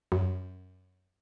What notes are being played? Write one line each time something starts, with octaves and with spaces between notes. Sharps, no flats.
F#2